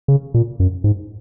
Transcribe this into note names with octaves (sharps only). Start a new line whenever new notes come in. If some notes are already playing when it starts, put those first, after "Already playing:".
C#3
A#2
F#2
G#2